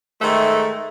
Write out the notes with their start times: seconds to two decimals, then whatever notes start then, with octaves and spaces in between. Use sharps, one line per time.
0.22 G#2 D#3 A3